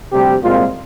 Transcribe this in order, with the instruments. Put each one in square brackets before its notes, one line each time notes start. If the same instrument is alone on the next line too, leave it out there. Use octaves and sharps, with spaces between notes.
[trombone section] D2 C3 G3 G4
C2 A#2 G#3 C4 F4